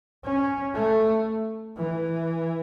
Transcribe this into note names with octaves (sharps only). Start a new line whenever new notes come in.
C#4
A3
E3